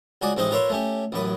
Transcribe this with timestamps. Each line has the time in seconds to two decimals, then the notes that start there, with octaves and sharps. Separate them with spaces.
0.22 C#2 F#4 G#4 D5
0.37 A1 G#3 C4 D#4 C5 D#5
0.51 F4 A#4 B4 C#5 E5 C6
0.70 A3 C#4 G4
1.12 A1 F#2 B4 D#6